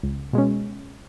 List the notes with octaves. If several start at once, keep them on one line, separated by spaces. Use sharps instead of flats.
C#2
B2 G#3 C#4